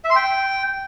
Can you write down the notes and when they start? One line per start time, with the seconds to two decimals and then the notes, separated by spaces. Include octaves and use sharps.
0.04 E5
0.10 C6
0.16 G5